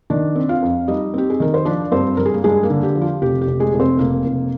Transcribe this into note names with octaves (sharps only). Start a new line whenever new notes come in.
D#3 D4 D5
C4
F4 F5
F2
G3 D#4 D#5
C4 G4
G#4
D#3 A#4
C5
F3 D4 D5
D5
G2 C4 C5
G2 A#4
G#4
A#3 A#4
G2 G#3 G#4
A#3 A#4
D3
G4
F3
F4
F1 G4
G4
F1
G#3 G#4
F1
C4 C5
F1 A#3 A#4
F1